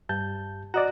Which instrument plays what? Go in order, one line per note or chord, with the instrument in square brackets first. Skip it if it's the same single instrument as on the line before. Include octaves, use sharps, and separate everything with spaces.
[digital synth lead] G2 [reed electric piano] A5 G6
[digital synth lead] F#4 [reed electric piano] D5 D#5 A#5